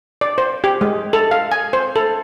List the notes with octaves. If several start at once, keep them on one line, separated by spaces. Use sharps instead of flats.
D5
C5
G4
G#3
A4
F5
G#5
C5
A4